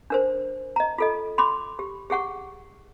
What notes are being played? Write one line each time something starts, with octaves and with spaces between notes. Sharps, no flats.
D4 A#4 C5
D#5 A#5
F4 A4 D#5
B5 C6 D6
G4
G4 G#4 F#5 C#6